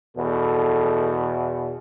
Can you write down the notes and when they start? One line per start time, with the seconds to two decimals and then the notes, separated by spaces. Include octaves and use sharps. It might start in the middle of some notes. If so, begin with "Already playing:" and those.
0.17 E2 B2 A4